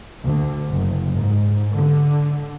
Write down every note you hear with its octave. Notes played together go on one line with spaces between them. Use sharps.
D2
F#1
G#2
D3